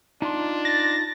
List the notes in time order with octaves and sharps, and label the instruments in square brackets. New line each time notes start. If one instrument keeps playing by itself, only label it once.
[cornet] D4 [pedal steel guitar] D#4 F4 C6
[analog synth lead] A6 [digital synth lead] A#6